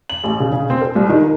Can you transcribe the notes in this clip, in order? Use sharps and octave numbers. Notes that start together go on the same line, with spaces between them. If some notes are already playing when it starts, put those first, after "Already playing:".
F#7
A1
C#3
C#3
C4
A4
C2
D#3
A#4